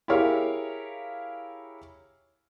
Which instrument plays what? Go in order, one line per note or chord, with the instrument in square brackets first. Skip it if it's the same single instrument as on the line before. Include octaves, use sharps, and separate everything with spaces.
[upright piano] E4 G4 G#4 A#4 C#5 F5